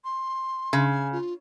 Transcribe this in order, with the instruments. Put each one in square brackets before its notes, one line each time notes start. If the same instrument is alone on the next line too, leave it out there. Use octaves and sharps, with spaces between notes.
[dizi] C6
[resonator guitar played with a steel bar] C#3
[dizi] G#5
F4